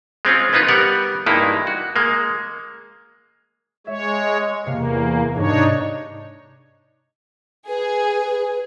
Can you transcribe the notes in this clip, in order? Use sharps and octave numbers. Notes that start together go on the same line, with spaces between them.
G#3 C4 C#4 F4
A#3 B3 D#4 F4 B4
G3 B3 A#4 F#5
G2 G#3 A#3 D#4 E4
F#4
G#3 A#3
G#3 C#5 E5
E2 C3 A#3 F5
G#2 C3 D4 D#4 C#5
G#4 B4